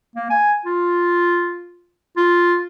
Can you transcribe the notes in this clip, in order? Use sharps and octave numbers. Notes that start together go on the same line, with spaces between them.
A#3
G#5
F4
F4